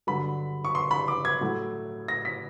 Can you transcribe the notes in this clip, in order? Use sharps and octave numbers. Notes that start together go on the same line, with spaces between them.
G2 D3 F#3 B5
C#6
C6
B5
D6
G#6
A2 F#3 A3
A#6
B6